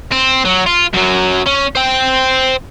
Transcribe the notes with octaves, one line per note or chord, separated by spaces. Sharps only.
C4
F#3
F4
F#2 F#3
C#4
C5 G5